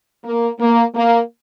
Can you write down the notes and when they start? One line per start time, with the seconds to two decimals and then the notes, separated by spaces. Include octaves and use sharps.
0.24 A#3
0.59 A#3
0.94 A#3